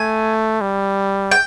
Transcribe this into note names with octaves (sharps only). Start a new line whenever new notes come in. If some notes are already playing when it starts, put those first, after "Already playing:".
Already playing: A3 G#5
G3
G5